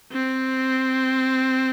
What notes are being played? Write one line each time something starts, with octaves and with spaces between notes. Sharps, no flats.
C4